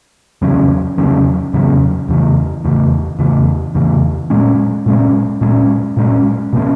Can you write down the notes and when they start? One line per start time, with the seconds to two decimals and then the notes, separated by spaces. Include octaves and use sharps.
0.42 E2 C#3 F#3 C#4
0.98 E2 C#3 F#3 C#4
1.53 E2 C#3 F#3 C#4
2.09 E2 C#3 E3
2.64 E2 C#3 E3
3.19 E2 C#3 E3
3.75 E2 C#3 E3
4.30 A#2 G#3 C#4
4.86 A#2 G#3 C#4
5.41 A#2 G#3 C#4
5.97 A#2 G#3 C#4
6.53 B2 A#3 C#4